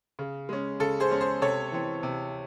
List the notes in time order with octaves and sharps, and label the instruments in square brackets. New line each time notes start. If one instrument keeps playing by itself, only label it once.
[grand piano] C#3
G#3 C#4
C#3 A4
G#4 C5
G#3 C#4
G#4 C5
C3 A4 C#5
E3 C4
C3